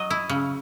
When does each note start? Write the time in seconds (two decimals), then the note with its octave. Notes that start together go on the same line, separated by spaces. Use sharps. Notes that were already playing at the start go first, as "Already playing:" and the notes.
Already playing: F#3 D#5
0.10 E4
0.29 C#3